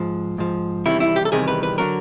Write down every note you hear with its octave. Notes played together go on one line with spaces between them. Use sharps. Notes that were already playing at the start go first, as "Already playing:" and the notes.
Already playing: G#2 F3
G#2 F3
E2 C3 D#3 G3 E4
E4
G4
A4
E2 C3 D#3 G3 G#4
B4
B4
D3 F#3 A#4